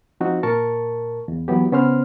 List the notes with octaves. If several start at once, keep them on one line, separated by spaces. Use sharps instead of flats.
F3 C4 D#4 F#4
A#2 A#4 A5 C#6
E2
E3 F#3 B3 G4
C#3 B3 C#4 C5 C6 F6